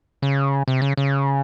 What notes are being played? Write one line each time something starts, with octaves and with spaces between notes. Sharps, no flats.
C#3
C3
C#3
C#3